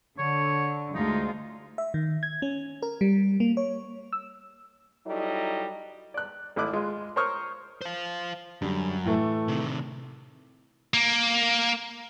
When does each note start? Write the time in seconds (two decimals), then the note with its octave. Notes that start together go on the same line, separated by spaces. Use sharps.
0.18 D3 C#5
0.95 D2 G#3 D#4 F4
1.78 E5
1.94 D#3
2.23 G#6
2.42 C#4
2.82 A#4
3.01 G3
3.40 A#3
3.57 C#5
4.13 E6
5.06 F#3 G3 D#4 E4 A4 D#5
6.14 D5 F#6
6.56 G#1 A3 E4 D#5 D6 F#6
6.73 G#3 F4
7.16 A#4 C5 C#5 C#6 D#6 F6
7.81 C5 F5
8.62 F#2 D3 G3
9.05 A2 E3 A3
9.48 C3 D#3
10.94 A#3